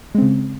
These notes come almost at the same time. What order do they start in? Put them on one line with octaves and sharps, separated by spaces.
G#3 C4 C#3